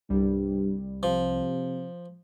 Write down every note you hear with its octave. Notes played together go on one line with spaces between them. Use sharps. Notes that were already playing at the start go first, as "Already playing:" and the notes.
C2 G2 G3
C3 F3